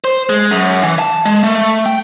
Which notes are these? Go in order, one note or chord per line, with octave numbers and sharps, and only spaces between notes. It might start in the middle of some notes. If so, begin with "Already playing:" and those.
C5
G#3
F#2
E3
A5
G#3
A3
G5